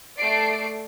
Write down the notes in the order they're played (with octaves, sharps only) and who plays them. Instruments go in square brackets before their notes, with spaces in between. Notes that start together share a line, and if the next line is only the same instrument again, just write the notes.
[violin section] A3 D5 C7 D7